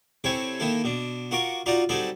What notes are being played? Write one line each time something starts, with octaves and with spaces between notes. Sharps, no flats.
C3 C4 E4 A4 C#5 G#5
D#3 A#3 E4 A4
B2 D4
F4 F#4 A#4 C#6 D6
D#4 F4 F#4 D5 A#5
F#3 G3 C4 D#4 A4 D5